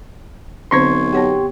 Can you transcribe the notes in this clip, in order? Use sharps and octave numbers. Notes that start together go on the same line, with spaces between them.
B1 D3 C4 C5 C6 C#6 G#6
B3 G4 C#5 F#5